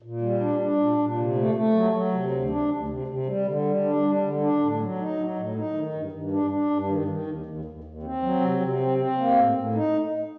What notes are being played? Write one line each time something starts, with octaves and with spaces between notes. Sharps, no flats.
A#2
G3
D4
D4
A#2
A#2
C3
A3
A3
F#3
F#3
C3
D2
D4
D2
C3
C3
G3
D3
G3
D4
G3
D3
D4
A2
F#3
D#4
F#3
A2
D#4
D#3
G2
G2
D4
D4
G2
D#3
D#3
D#2
D#2
D#2
D#2
C4
F#3
C3
C3
C4
C4
A#3
A2
A2
D#4